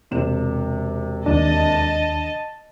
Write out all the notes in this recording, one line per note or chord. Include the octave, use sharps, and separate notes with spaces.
E1 C3 E7
D#2 D4 D#5 A5